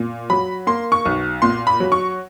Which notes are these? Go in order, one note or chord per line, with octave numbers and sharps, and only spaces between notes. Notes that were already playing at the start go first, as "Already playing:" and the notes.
Already playing: A#2
F#3 B5
A#3 C6
C#6
B1
A#2 C6
B5
F#3
C#6